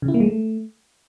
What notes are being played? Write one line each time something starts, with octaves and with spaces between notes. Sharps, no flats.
C#3
E4
A#3
G#3
A3